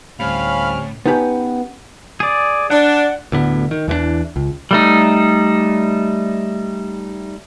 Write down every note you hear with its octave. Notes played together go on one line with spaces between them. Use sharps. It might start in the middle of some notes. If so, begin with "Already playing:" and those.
D2 A2 G3 C4 C#4 F5 B5 F6
B3 C#4 D#4 G4 B4
G#4 D5
D4 F#5
D2 A2 D3 B3
D#3
E2 E3 G3 D4
C#2
G3 A3 D#4